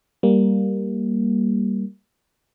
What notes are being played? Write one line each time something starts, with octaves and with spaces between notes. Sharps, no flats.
G3 A#3